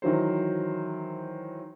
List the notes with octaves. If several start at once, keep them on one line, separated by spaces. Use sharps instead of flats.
D#3 E3 F#3 C5